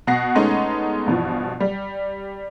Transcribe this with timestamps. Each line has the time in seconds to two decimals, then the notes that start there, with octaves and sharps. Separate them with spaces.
0.07 B2 F#5 A#6 C7
0.35 G#3 A3 B3 C#4 D#4
1.06 G2 B2 E3 F3
1.60 G3